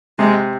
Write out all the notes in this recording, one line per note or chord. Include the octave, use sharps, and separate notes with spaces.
C3 G#3